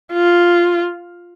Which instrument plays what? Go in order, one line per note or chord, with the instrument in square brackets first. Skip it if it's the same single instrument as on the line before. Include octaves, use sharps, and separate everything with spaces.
[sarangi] F4